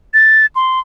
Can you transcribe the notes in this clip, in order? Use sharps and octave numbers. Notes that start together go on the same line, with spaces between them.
A6
C6